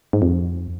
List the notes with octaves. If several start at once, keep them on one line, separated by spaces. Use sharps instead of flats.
G#2
F2